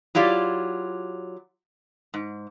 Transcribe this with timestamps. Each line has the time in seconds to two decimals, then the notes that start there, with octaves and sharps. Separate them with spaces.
0.15 F#3 E4 F4 G4 D5
2.14 G#2